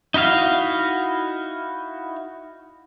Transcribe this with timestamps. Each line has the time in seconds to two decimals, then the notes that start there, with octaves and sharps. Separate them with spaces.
0.14 D#4 E4 F#4 F5